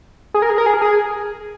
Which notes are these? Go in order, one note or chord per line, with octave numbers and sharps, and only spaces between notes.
G#4
A#4
G#4
A#4
G#4
A#4
G#4